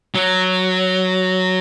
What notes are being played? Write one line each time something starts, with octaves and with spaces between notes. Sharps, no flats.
F#3